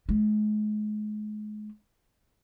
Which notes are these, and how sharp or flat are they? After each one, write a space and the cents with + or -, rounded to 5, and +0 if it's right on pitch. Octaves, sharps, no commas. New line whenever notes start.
G#3 +35